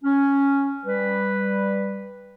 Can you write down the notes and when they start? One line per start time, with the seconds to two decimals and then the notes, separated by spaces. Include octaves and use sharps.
0.04 C#4
0.85 G3 B4